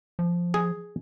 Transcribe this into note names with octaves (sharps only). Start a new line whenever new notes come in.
F3
G#4